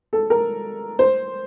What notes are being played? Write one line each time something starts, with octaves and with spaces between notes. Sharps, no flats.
A4
A#4
C5